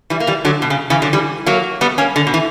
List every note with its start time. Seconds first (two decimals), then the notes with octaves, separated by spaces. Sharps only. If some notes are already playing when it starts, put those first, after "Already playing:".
0.10 E3 G3
0.20 A#3
0.27 E3 G3
0.45 D3 F#3
0.62 B2
0.70 C#3
0.90 C#3 E3
1.02 D3 F#3
1.13 E3 G3
1.46 F#3 A#3
1.81 G3 B3
1.98 A#3 C#4
2.16 D3
2.27 B2
2.34 E3